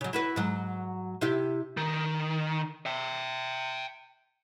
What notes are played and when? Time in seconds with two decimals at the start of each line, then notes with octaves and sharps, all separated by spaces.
0.01 C#3 F#3
0.13 E4 F#4 B4
0.36 G#2 F#3
1.21 C3 E4 G4
1.77 D#3
2.86 E5 G5